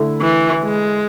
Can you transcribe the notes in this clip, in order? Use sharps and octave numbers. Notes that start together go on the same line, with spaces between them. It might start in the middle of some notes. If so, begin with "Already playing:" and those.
Already playing: D3 A3 E4
E3
G#3